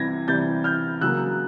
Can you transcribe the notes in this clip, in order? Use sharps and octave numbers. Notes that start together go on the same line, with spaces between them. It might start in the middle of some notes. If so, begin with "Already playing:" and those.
Already playing: C3 E3 G3 G#6 A#6
C3 E3 G3 G6 A6
F6 G6
C#3 F#3 A#3 E6 F#6